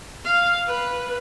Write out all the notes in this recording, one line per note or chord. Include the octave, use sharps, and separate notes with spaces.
F5
B4